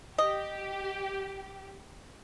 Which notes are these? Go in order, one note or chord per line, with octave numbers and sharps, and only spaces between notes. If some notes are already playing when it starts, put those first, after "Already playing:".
G4 D#5